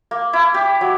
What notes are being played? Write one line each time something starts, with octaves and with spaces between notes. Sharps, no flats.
A#3
E4
G4
F#3